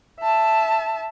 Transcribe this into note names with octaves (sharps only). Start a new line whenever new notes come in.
E5 A5